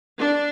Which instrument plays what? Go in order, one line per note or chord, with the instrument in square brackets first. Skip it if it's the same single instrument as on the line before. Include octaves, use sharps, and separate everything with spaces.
[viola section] D4